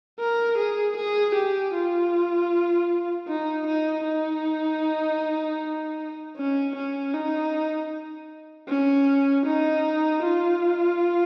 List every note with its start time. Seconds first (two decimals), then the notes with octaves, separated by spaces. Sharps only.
0.20 A#4
0.58 G#4
0.97 G#4
1.35 G4
1.74 F4
3.28 D#4
3.67 D#4
4.05 D#4
6.37 C#4
6.76 C#4
7.13 D#4
8.68 C#4
9.45 D#4
10.23 F4